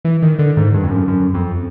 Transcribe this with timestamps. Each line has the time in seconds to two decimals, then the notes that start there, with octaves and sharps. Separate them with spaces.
0.05 E3
0.22 D#3
0.39 D3
0.57 G#2
0.74 G2
0.84 F2
0.91 F#2
1.08 F#2
1.34 F2